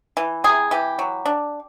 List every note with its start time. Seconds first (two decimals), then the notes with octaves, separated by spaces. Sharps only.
0.17 E3
0.44 C3 G#4
0.71 E3 G4
0.99 F#3
1.26 D4